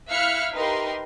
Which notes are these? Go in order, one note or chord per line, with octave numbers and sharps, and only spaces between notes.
E4 E5 F5 F6 F#6 C#7
D#4 G4 A#4 B4 C6